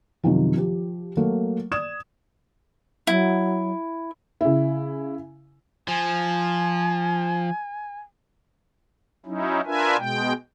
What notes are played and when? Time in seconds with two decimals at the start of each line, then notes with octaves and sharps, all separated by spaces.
0.23 F#2 C3 D#3 F3
0.57 F3 G4
1.17 F#3 A3 A#3
1.71 D5 D#6 G#6 E7
3.07 F#3 E4
4.41 C#3 E4
5.88 F3 G#5
9.26 F#3 C#4 D#4 E4
9.66 D4 F4 A#4 B4 E5 G#5
9.98 B2 G#3 G5